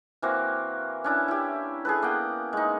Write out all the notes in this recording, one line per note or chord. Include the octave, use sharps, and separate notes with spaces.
E3 A#3 C4 F#4
C#4 D4 E4
E4 G4
G#4 A4 B4
A#3 B3 F#5 G5
G#3 D#4